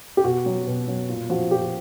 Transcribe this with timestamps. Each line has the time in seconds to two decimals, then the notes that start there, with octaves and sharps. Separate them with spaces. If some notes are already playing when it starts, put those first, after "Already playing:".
0.17 G4
0.24 B2 F#4
0.46 F#3
0.67 B2
0.88 F#3
1.09 A#2
1.30 F3 F#4
1.51 A#2 G4